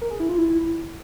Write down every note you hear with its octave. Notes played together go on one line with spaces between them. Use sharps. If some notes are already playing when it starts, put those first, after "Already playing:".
A#4
G#4
E4
F4
E4